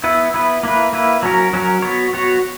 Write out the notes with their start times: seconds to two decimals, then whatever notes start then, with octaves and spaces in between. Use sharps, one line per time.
0.04 B3 E4 B4
0.34 B3 E4 B4
0.63 A#3 E4 B4
0.93 A#3 E4 B4
1.23 F#3 C#4 F#4 A#4
1.53 F#3 C#4 F#4 A#4
1.82 B3 F#4 C#5
2.13 B3 F#4 C#5